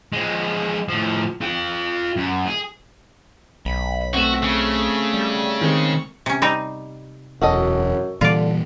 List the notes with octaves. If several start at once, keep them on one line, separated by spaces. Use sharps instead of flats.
F3 G#3
A2 F3
F4 G5
F#2
G#4
B1 B5
A3 C4 F#4 E5 E7
C#3
G3
D#3 G#3 C4 C#6
C3 C#4
G3 C4 D#4
E1 F#2 F#4 A4 D#5
A#2 D3 E3 G3 F4 D5